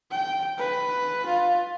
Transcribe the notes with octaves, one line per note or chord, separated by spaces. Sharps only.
G5
B4
F4